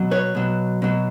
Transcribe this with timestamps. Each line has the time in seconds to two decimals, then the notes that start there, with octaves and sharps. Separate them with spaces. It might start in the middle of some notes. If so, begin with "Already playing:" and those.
Already playing: B2 F#3
0.11 B4 C#5
0.35 B2 F#3
0.82 B2 F#3